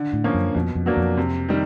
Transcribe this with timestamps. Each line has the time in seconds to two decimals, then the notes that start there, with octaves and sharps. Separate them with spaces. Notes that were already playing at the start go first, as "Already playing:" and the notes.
Already playing: D3
0.13 A2
0.24 F3 A#3 C#4
0.34 F#2
0.55 F2 B2
0.75 F2
0.86 F#3 A#3 D4
0.97 F2
1.17 C3
1.49 D#3 G3